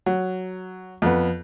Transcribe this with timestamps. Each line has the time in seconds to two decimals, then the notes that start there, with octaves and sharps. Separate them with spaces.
0.06 F#3
1.02 F2 B3